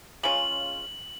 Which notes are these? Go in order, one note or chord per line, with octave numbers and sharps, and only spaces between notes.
C#3 G#3 C#4 F4 F#7